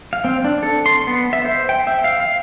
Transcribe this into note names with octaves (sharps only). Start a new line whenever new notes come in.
F5
C4
D4
A4
C6
B3
E5
C5
G5
E5
F5
F5